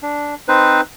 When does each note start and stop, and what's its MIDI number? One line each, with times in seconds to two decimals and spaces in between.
0.02 0.35 62
0.48 0.81 60
0.48 0.81 63
0.48 0.81 71
0.48 0.81 72